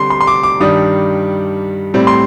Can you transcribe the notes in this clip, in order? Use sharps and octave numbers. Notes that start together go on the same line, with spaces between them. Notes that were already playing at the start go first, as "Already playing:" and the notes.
Already playing: D3 G3 C4 C6
C6
C6
D6
D6
G2 D#3 G3 D4 D#6
A2 G3 C4
C6